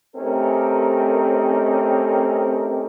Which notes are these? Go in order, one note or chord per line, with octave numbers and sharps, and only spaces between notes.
A3 C4 C#4 D#4 G4 A#4